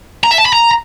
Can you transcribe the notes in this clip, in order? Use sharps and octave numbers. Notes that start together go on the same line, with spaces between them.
A#5
E5
A5
B5
A#5